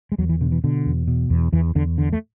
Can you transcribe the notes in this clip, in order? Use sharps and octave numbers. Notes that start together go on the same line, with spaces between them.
G#3
E2 F#3
E3
B2 D3
E3
B2 D3
E2
B2
E2
E2 E3
E2 D3
D3
A3